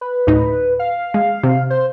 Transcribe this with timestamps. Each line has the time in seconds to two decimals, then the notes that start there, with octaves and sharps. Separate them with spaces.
0.01 B4
0.27 D2 A2 D#4
0.79 F5
1.14 G#3
1.43 C3
1.70 C5